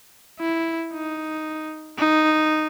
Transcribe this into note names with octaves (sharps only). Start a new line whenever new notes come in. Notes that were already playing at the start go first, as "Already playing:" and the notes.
E4
D#4
D#4